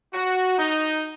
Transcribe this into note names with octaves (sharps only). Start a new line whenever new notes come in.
F#4
D#4